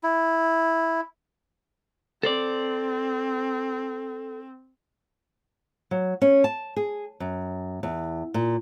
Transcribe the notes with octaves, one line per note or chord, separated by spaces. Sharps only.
E4
C4 A4 C5 D5
F#3
C#4
A5
G#4
F#2
E2
A#2